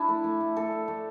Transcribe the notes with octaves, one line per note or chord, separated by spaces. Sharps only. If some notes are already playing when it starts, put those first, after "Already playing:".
Already playing: D4 E4
A3
A3
A3
A3 A4
A3
A3